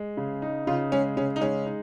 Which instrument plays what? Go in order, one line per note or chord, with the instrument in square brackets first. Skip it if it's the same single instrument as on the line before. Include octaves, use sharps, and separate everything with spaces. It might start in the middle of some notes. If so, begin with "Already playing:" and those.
Already playing: [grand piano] G#3
C#3
D#4
[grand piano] C#3 [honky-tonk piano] F4
[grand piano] G#3 [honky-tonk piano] C#4
[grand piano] C#3 [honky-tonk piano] C#4
[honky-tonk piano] D#4
[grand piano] G#3 [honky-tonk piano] C#4
[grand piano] D#4